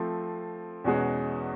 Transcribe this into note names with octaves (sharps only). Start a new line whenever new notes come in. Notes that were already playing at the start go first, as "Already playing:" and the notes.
Already playing: F3 A3 C4
E2 B2 G#3 C#4 F#4